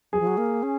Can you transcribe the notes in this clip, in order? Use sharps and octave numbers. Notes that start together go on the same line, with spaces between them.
F#3 G#4
F3
F#3
A#3
C#4